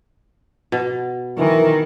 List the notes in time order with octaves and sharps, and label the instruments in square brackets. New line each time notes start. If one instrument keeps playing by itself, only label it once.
[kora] B2
[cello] D#3 [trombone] E3 [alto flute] A#4